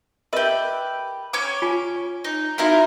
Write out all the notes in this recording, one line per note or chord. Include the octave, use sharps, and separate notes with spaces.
G4 A#4 B4 D#5 E5
C#4 C#5 D6
F4 G#5
D#4
D#4 E4 F#4 A#4 E5 F5